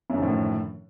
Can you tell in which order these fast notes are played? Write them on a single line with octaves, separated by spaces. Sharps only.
F#2 D3 D#3 F3 A2